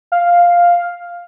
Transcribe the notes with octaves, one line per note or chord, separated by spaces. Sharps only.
F5